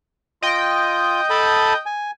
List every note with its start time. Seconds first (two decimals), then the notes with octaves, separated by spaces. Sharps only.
0.42 F4 D#5 G5
1.30 A4 A5 B5
1.86 G#5